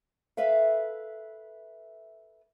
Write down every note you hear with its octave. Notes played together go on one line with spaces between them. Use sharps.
A4 B4 E5 F5